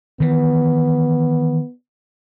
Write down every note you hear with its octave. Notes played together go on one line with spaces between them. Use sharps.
D#3 E3 B3